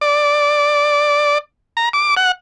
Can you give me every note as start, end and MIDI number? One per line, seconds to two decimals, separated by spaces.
0.01 1.38 74
1.77 1.89 82
1.93 2.15 86
2.17 2.32 78